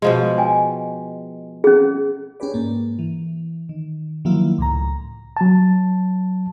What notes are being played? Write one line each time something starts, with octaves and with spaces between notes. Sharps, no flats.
B2 F3 G#3
G5 G#5
C#4 G#4
C#4 G4 G#4 B4 D5
G#2 A#3
E3
D#3
D#3 F3 F#3 A#3 E4 F4
C#2 A2 A#5
F#3 A5